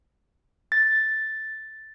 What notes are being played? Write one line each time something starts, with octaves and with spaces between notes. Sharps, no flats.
A6